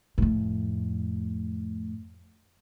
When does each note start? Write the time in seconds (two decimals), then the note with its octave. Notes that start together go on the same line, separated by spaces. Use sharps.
0.18 F2 A2